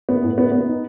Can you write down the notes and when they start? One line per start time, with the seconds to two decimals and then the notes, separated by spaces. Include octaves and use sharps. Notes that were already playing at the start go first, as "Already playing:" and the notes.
0.09 B3
0.23 A2
0.38 B3
0.52 B3
0.67 D#4